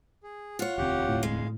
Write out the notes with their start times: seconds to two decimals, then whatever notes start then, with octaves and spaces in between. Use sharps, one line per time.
0.23 G#4
0.59 F4 C#5 F#5
0.78 E1 D2 C4 G4 F#5
1.08 A2
1.23 G#3 F5